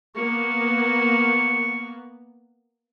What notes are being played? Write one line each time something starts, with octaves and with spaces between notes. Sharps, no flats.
A#3 B3 C#6